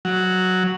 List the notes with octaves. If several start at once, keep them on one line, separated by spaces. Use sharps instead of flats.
F#3